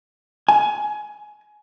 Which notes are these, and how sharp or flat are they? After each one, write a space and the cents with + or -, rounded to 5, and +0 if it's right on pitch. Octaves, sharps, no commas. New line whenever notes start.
G#5 +20